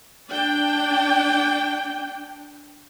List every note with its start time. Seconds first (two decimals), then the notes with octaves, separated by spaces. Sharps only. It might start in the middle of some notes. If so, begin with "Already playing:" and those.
0.31 D4 G5